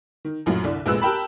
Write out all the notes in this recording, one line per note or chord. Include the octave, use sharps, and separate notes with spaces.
D#3
A#1 F#2 A2 F#3
C2 D3 D5
F1 A#1 G#3 B4 E6 F#6
G4 A#4 G5 A5 B5